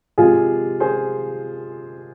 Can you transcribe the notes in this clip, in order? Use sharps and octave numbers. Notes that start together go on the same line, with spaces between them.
C3 F3 G#3 F4 G#4
G#4 C5